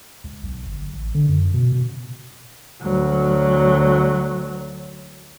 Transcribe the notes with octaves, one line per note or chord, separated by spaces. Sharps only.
C#2
B1
G1
A1
D3
F#2
B2
B2
D2 F#3